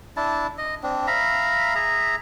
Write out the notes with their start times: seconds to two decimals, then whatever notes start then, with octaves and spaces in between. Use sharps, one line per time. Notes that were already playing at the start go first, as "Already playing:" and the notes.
0.17 D4 E4 A5
0.58 D#5
0.83 C4 D4
1.07 E5 F5 A#5 B5
1.75 G#4 E5 A#5